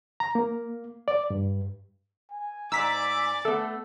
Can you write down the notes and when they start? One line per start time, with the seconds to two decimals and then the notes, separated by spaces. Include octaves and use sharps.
0.20 A#5
0.35 A#3
1.08 D5
1.30 G2
2.31 G#5
2.72 G#2 D5 A#5 D6 E6 B6
3.45 A3 B3 A4